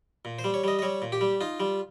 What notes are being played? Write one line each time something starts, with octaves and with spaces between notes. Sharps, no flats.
A#2
C5
G3
C#5
G3 D#5
D#5
G3 C#5
A#2
G4
G3
D#4 F4
G3